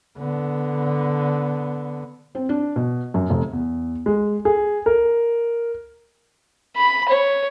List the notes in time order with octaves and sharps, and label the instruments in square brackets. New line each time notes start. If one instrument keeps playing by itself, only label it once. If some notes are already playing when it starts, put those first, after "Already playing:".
[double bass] D3 B3
[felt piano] C4
D4
B2
F#2
F1
[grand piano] E2
G#3
G#4
A#4
[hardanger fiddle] B5
C#5